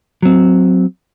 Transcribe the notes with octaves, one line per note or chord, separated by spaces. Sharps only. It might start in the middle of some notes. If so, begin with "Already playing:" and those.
F#3 C4